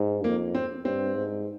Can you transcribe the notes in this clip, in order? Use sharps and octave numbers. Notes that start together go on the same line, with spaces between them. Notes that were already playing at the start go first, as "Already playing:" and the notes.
Already playing: G#2
F2 A#3
C4
G2 C4
G#2